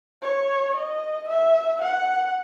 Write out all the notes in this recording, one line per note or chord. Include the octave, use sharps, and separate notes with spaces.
C#5
D#5
E5
F#5